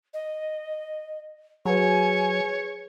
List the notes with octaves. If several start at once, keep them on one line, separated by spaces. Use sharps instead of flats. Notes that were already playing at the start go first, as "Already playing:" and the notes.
D#5
F#3 G#4 B4 C#5 G#5